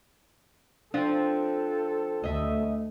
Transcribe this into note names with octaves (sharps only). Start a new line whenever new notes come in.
F3 C4 D4 A4
D2 A3 D#5 E5